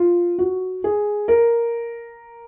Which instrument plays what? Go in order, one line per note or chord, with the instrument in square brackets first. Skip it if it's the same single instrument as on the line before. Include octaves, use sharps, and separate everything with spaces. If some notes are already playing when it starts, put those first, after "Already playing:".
Already playing: [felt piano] F4
F#4
G#4
A#4